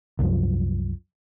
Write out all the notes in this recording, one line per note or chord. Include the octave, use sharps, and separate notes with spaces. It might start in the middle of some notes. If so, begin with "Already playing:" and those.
C2 F#2 F3